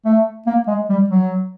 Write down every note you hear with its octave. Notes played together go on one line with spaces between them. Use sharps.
A3
A#3
G#3
G3
F#3